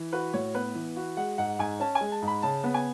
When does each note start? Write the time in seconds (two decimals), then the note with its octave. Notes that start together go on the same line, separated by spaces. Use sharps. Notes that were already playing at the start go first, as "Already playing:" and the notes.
Already playing: E3
0.13 F#4 B4
0.33 A2 C#5
0.55 B3 B4
0.75 E3
0.96 F#4
1.17 G#3 F#5
1.38 G#2 F#5
1.59 G#2 G#5
1.80 C#4 A5
1.95 G#5
2.01 G#3
2.12 A5
2.22 G#2
2.28 B5
2.42 C#3 A5
2.64 B3
2.74 G#5